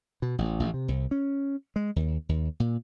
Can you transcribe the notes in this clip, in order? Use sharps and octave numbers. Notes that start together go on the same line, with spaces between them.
B2
A1
A1
C3
C2
C#4
G#3
D#2
D#2
A#2